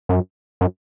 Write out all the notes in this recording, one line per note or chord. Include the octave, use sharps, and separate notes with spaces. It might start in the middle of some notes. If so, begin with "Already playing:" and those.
F#2
F#2